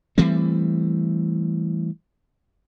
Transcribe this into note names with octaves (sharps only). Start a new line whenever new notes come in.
E3 G3 A3 C4